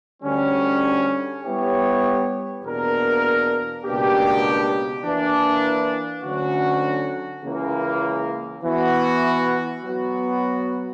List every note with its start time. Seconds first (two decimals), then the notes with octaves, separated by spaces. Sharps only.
0.23 D2 D3 G3 C#4
1.43 G3 B3 E4 G4 C#5
2.64 E2 B2 A#3 D4 A#4
3.84 C#2 B2 A#3 D4 G4
5.04 E3 A#3 D4
6.23 D2 D3 F#3 C#4 F#4
7.44 C#2 C#3 E3 A#3
8.64 E3 B3 F#4
9.84 F#3 B3 F#4